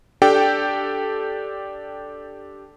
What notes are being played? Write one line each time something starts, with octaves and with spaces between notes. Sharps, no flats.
D4 G4 A4 G5